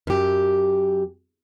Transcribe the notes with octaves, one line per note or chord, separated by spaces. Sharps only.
F#2 G4